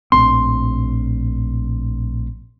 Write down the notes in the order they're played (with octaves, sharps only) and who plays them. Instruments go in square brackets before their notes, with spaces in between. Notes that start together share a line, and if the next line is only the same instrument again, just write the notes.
[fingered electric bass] A#1 A2 C4 [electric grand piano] C6